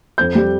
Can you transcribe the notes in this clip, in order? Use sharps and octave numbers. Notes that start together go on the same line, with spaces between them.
F2 G6
G3